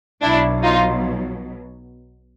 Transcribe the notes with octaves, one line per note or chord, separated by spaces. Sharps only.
B1 B2 F#3 D4 E4
D#4 F4